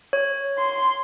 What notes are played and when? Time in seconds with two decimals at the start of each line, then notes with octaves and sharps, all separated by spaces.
0.13 C#5
0.58 C6